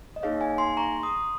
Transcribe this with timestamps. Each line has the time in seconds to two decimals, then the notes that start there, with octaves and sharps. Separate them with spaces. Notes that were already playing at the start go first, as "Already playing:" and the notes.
0.16 D#5
0.23 A#3 D#4 G#4 C#5 F5
0.41 F5 G#5
0.58 G#5 C6
0.77 A#5 C#6
1.03 C6 D#6